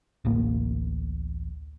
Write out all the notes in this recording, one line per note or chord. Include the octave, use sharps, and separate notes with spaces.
D1 A1 A#3